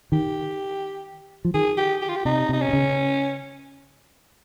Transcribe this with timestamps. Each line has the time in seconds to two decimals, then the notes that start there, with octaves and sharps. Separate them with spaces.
0.12 D#3 G4
1.45 F3
1.54 D#3 G#4
1.78 G4
2.02 G4
2.09 F4
2.16 G4
2.25 C3 D#4
2.49 C3 D#4
2.62 C#4
2.69 C3
2.73 C#3